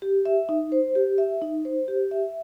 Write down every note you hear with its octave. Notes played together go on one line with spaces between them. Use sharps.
G4
E5
D#4
C5
G4
E5
D#4
C5
G4
E5